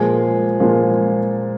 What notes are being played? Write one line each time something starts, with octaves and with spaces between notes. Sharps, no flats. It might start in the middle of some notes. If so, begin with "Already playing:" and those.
Already playing: A#2 F3 G#3 G#4
A#2 F3 G#3